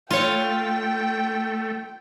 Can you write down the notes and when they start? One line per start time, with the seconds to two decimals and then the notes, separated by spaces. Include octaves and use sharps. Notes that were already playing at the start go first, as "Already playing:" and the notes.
0.11 A3 F4 C#5 G5 D#7